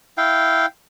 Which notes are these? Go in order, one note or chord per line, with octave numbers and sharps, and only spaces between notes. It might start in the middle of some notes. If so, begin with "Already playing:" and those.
E4 F5 G5